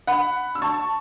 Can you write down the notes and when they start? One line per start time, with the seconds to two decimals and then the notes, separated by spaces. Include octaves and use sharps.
0.07 F#5 B5
0.55 E6
0.62 A5 C#6